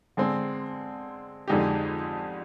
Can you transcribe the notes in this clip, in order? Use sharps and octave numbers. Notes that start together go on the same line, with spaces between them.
D3 G#3 C4
F2 D3 G#3 D#4 G4